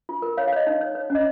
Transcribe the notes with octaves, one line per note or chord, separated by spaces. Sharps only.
F4
A#4
C#5 F5
F5
C#5 D#5
D#4
C#5
C#5
C#4 D#5